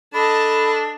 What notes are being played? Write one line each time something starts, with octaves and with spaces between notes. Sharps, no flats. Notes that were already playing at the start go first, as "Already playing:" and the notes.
D4 A4 D#5 A5 B5